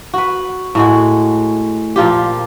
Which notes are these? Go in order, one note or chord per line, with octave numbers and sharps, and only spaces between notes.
F#4 B4
A2 G#3 F#4
A#2 F3 F4 G4